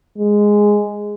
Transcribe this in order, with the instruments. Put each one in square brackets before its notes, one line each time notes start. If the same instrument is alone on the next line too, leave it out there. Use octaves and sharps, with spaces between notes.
[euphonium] G#3